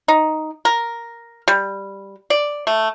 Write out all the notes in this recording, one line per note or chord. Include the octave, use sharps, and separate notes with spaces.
D#4
A#4
G3
D5
A3